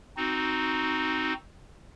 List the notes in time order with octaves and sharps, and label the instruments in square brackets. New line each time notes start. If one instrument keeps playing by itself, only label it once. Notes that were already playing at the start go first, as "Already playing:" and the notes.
[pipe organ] C4 D#4 F#4